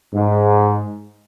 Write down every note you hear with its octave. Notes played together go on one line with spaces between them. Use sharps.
G#2